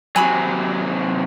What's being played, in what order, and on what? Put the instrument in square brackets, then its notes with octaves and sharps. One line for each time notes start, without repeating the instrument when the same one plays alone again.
[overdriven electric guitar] C3 F#3 [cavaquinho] G#5 B5 D6